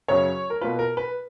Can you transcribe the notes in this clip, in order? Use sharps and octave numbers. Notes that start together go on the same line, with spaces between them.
F#2 C#3 F#3 C#5
A#4
B2 A#3 F4 B4
A#4
B4